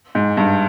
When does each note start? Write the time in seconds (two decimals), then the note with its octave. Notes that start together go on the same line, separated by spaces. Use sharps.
0.15 G#2
0.37 G2